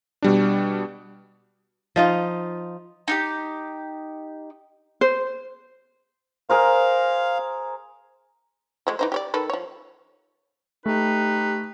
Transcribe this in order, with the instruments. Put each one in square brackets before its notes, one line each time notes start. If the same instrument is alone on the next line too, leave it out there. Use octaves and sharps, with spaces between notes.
[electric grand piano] B2 G3 D4
[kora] F3 D#4 F4
[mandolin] D#4 F4 G4
[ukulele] C5
[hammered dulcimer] G#4 A#4 C5 [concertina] F5
[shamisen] F3 G#3 A3
E3 D#4 C5
G4 C#5 D5
D#3 A4 B4
F3 C#5
[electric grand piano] A3 [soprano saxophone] D#4 [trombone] G4 [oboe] B4